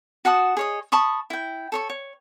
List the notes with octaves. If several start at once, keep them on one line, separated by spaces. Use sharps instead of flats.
F#4 F#5 A5 D#6
G#4 C#5 D#5
A5 B5 C#6 D#6
E4 G5
A4 C#5 C#6
C#5